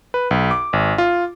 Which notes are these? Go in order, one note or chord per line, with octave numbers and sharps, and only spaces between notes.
B4
B1
D6
G#1
F4